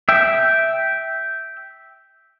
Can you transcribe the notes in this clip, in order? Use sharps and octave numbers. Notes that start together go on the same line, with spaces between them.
E5 G5